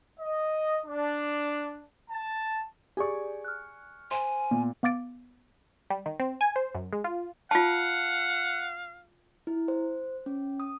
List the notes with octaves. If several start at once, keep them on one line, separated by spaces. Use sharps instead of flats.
D#5
D4
A5
G4 G#4 D5 G#5 C#6
F6 F#6
C5 G#5 C6
A#2 B3
B3 F5 D6 A6 D7
G3
D#3
C4
G#5
C5
F#2
G#3
F4
F4 F5 F#5 A5
E4
C5
C#4
D#6